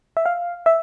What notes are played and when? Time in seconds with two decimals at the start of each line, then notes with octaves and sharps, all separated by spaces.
0.17 E5
0.26 F5
0.66 E5